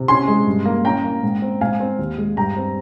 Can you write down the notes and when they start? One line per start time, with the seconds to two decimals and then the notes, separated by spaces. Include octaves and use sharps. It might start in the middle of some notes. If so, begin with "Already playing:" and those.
Already playing: C3
0.08 C#4 G#5 C6
0.28 G#3
0.47 G2
0.65 A#3
0.84 C#4 G5 A#5
1.04 A#3
1.23 G#2
1.42 C4
1.61 G#2 F5 G#5
1.80 C4
1.99 D#2
2.18 G#3
2.36 G2 G5 A#5
2.57 C4